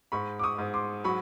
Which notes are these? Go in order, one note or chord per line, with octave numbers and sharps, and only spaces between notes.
G#2 B5 C#6
D6
C#6 D#6
G#2
C6 D6
F#3 B5 C#6